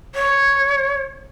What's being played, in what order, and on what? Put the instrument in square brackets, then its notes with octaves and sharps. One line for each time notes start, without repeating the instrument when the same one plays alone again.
[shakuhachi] C#5